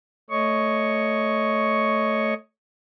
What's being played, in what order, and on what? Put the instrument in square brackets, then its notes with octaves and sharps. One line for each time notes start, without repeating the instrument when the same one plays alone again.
[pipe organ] A3 C#5 D#5 C#6